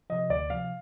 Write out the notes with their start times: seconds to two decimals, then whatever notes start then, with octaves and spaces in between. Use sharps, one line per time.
0.10 C3 F3 D#5
0.30 D2 D5
0.50 C3 F3 F5